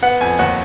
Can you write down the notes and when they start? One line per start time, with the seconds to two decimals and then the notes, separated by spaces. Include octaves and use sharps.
0.02 B3 F#5
0.21 F2 G#5
0.39 D#2 F#5